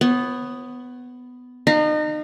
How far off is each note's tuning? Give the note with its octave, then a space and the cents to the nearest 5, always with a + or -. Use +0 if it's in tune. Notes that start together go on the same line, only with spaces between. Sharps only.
B3 +10 C#5 -35
D#4 -35 F5 +5